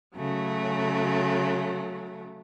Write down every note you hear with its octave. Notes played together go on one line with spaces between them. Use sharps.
C#3 F#3 A3